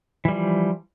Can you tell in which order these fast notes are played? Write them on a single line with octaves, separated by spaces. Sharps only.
E3 G3 F3